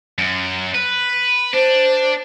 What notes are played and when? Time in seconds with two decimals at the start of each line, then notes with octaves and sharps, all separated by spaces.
0.18 F#2
0.75 B4
1.54 D4 C5